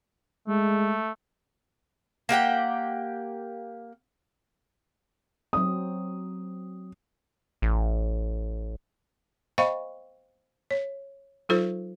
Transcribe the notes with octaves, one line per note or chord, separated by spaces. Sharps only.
G#3 A3
A#3 G4 F#5 G5
F#3 C4 D#6
A1
C5 D#5 F5 G5 B5 C#6
C#5
F#3 D#4 F4 A4 C5